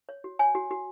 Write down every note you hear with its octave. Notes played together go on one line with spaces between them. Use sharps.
C#5
F#4
C#5 G#5
F#4
F#4